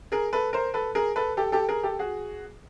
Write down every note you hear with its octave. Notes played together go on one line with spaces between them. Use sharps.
G#4 A#4
A4 B4
A#4 C5
A4 B4
G#4 A#4
A4 B4
G4 A4
G4 A4
G#4 A#4
G4 A4
F#4 G#4